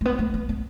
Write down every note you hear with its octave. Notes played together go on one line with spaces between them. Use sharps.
A3
B3
A3
B3
B3